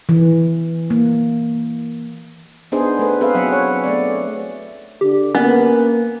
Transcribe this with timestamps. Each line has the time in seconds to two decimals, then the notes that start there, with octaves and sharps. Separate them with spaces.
0.09 E3
0.90 A#3
2.72 B3 D4 D#4 G#4 C5
2.99 A3 A4 B4
3.21 C4 G#4 B4 E5 F5
3.35 F#3 B3 F#5
3.53 C#5
3.84 A3 B3 D5
5.01 D3 G4
5.35 A#3 B3 C#4